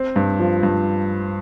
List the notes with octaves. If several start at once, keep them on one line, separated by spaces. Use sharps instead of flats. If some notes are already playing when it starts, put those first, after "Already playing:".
Already playing: C4
G2
F3
G2